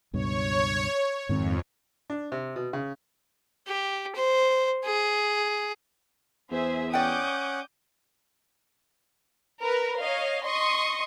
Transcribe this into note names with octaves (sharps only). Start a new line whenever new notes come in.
C#2 G2 B2 C#5
F2 G#2 D#3 C4
D4
C3
B2
C#3
G4
C5
G#4
E2 G#4 C5 E5
C#4 D5 F#5 G5 D6 D#6 G6
A#4 B4
C#5 D#5 F5
D#5 C6 C#6 D#6